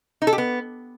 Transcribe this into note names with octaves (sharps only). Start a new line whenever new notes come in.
D#4
A4
G4
B3